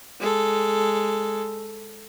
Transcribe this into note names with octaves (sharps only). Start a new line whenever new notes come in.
G#3 A4